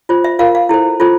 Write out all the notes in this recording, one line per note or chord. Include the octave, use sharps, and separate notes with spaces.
F4 C5
E5
F4 A#4 F5
F5
E4 A4 C5
F4 A4 C5